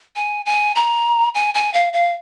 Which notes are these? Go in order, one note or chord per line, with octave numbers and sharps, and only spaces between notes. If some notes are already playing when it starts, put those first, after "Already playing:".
G#5
G#5
A#5
G#5
G#5
F5
F5